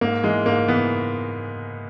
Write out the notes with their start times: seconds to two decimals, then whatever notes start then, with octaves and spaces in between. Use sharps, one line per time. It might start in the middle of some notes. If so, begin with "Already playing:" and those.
0.01 G#2 A#3
0.24 E3 G#3
0.46 G#2 A#3
0.68 E3 B3